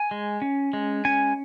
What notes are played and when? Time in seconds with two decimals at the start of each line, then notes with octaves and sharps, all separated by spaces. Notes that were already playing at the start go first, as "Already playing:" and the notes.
Already playing: G#5
0.11 G#3
0.42 C#4
0.73 G#3
1.05 C#4 G#5